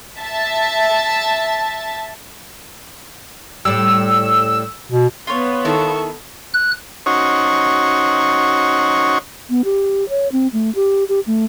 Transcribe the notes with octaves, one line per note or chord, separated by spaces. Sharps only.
E5 A5 A6
A2 G3 E6
B2
B3 F4 C#5
D#3 E4 A4 C#6
F#6
C#4 D#4 F#4 C5 C#5
B3
G4
C#5
C4
A3
G4
G4
A3